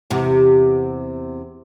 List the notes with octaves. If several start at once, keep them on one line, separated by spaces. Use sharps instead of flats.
E2 C3